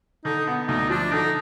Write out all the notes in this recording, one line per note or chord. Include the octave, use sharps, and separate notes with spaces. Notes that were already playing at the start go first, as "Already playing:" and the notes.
D3 D#4
B3
D2 D#4
F3 D4
D3 D#4